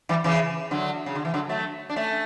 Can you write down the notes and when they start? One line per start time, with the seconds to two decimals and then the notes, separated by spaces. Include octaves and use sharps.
0.09 E3 G3
0.24 C#3 E3
0.71 D3 F#3
1.06 C#3
1.15 D3
1.25 E3
1.34 D3 F#3
1.49 F#3 A3
1.90 D4
1.96 A3 C#4